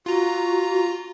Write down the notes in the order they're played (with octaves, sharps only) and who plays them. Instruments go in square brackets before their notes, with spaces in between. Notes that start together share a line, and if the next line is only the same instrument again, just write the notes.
[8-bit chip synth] F4 A#5 [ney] F#4